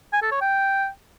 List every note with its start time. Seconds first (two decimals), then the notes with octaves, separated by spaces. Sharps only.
0.13 G#5
0.22 A4
0.32 C#5
0.41 G5